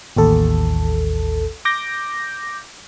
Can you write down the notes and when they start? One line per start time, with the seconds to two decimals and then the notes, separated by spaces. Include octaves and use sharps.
0.16 A1 D#2 A4
1.65 D6 G6 A#6